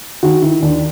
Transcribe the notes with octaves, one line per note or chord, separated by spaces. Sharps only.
D#3 F#4
D#3 E4
D#2 D4